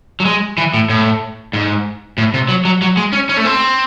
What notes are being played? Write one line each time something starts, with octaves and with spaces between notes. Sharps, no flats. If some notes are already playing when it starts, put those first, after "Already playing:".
F#3
G#3
E3
A2
A2
G#2
A2
C3
F#3
F#3
F#3
G#3
C#4
C#4
A3
C4